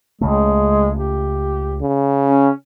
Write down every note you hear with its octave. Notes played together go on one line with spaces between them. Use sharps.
C#2 C#3 G#3 A3
G4
C#3
C#4